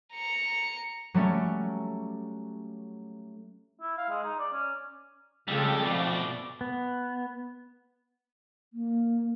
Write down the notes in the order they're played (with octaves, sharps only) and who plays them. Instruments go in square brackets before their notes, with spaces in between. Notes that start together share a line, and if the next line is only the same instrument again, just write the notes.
[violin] A#5 C#7
[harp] F#3 G3 A3 C#4
[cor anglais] E4
F5
G#3
D#4
D5
C#4
[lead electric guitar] F2 [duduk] C#3 [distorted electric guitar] G3 G4 [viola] G#3 A4
[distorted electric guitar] B2 A3 [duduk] F3 [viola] D5
[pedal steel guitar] B3
[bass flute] A#3